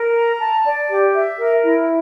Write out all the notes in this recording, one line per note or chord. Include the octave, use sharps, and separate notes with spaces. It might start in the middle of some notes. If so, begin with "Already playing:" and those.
Already playing: A#4
A#5
A5
D5
G4
E5
A#4
E4